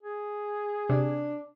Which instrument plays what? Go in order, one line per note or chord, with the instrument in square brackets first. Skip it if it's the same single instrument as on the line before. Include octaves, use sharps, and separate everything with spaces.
[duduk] G#4
[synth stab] C3 [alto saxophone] D4